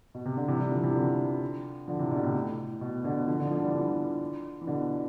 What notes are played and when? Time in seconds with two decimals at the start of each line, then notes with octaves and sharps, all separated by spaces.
0.14 B2
0.25 C3
0.37 D3
0.48 C3 E3
0.60 E3 G3
0.71 D3 F3
0.83 C3 E3
0.95 D3 F3
1.88 D3 F3
1.99 C3 E3
2.11 B2 D3
2.23 A2 C3
2.34 A2
2.81 B2
3.04 B2 D3
3.27 D3 F3
3.39 D3 F3
3.51 D3 F3
3.63 E3 G3
3.74 D3 F3
4.61 E3
4.67 B2 D3